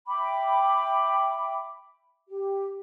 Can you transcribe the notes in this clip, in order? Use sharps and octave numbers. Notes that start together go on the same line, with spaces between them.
E5 G5 B5 D6
G4